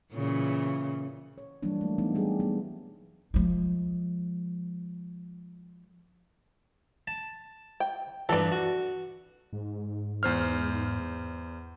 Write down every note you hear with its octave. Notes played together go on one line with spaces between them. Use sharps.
A#2 C#3 E3
C#5
E3 F#3 G3 A#3 D4
A3
E3 B3 D#4
G3 G4 G#4
G3 B3
F3 G#3
A5
G5
G2 E3 A4 D5
F#4
G#2
E2 C5 F6